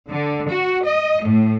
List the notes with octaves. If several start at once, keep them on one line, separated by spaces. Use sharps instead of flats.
D3
F#4
D#5
A2